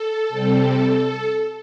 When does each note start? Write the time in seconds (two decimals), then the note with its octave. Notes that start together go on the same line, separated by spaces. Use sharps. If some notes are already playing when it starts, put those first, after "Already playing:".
Already playing: A4
0.29 C3 G3 C4